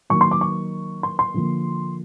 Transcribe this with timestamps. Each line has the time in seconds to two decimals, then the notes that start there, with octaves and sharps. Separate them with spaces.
0.10 D#3 F#3 A#3 C#6
0.21 C6
0.31 D6
0.41 C#6
1.03 C6
1.19 C6
1.34 D3 F3 A#3